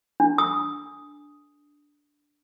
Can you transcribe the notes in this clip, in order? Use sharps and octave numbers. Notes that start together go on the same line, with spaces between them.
D4
D#6